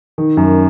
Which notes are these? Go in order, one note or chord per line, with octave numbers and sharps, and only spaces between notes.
D#3
F#2